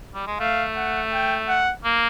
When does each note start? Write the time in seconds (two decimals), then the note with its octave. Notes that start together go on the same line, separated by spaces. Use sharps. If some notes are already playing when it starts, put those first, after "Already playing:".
0.14 G3
0.27 G#3
0.40 A3 F5
0.76 F#5
1.12 G5
1.48 F#5
1.85 A#3